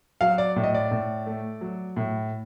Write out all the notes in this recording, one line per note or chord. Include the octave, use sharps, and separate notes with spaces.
F#3 F5
D5
A2
D#5
D5
A2
A3
F#3
A2